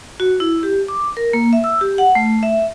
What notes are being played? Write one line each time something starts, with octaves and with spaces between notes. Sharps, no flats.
F#4
E4
G4
D6
A#4
A#3
E5
E6
G4
F#5
A3
E5